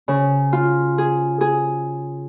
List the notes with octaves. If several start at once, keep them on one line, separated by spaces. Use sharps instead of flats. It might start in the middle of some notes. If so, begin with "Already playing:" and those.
C#3
F4
G#4
G#4